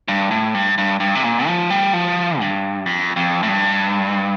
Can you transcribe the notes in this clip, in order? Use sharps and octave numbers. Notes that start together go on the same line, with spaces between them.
G2
A2
G2
G2
G2
C3
A#2
F3
G3
F3
G2
F2
F2
A2
G2